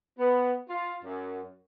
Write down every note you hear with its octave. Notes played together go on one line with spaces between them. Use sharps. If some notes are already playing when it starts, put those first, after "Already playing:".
B3
F4
F#2